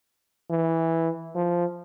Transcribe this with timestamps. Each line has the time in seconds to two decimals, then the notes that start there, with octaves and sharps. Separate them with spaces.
0.50 E3
1.35 F3